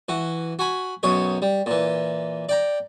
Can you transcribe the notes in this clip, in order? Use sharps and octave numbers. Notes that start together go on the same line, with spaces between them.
E3 F#4
F#4 G#5 B5
B1 F#2 C#4 C#5 D#5
G3
A#2 E3
D5 G5 A#5